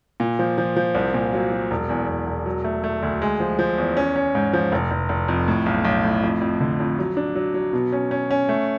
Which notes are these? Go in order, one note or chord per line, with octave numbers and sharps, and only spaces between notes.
A#2
F3
F3
F3
C2
A#2
F#3
F#3
E1
E2
E2
E1
F#3
A3
A3
D2
G#3
F3
F3
E2
C#4
C#4
G#2
F3
F1
F1
F1
F2
A2
B1
B1
A2
F2
F2
D3
F2
F#3
D4
F#3
F#3
B2
C#4
C#4
C#4
A3